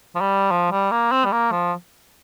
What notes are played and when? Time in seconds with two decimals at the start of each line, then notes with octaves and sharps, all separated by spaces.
0.15 F3
0.21 G3
0.51 F3
0.71 G3
0.91 A#3
1.11 C4
1.25 G3
1.32 A#3
1.51 F3